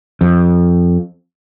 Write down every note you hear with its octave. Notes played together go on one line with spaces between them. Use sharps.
F2